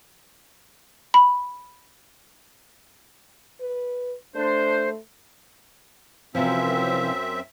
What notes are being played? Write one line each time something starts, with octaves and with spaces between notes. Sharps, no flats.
B5
B4
A3 D4 C5
F#2 C3 E3 F3 C4 E5